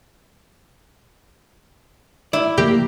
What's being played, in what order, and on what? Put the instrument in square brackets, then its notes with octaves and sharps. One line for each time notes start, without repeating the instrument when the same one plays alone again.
[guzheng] E4 [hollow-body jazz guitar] D5
[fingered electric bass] C#3 F3 A3 [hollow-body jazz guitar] A#3 [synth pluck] G4